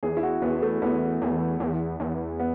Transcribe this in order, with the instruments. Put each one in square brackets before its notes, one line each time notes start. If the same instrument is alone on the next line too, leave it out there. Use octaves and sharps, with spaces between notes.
[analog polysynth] E2 [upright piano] G#4
[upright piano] E4
F#4
[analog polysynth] E2 [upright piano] B3
[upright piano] A3
[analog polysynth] E2 [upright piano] B3
[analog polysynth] E2
E2
E2
[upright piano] B3